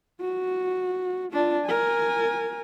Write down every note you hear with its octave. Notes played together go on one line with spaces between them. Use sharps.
F#4
D4 F4
A#4 G#5